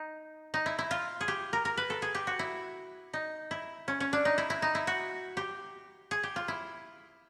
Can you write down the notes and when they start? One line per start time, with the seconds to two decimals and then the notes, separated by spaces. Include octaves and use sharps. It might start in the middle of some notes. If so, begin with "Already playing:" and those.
Already playing: D#4
0.54 D#4
0.66 E4
0.79 E4
0.91 F4
1.21 G#4
1.28 G4
1.53 A#4
1.65 A#4
1.77 B4
1.90 A4
2.02 G#4
2.15 G4
2.27 F#4
2.39 E4
3.13 D#4
3.51 E4
3.88 C#4
4.00 C#4
4.13 D4
4.25 D#4
4.38 E4
4.50 E4
4.62 D#4
4.75 E4
4.87 F#4
5.37 G4
6.11 G#4
6.23 G4
6.36 F4
6.48 E4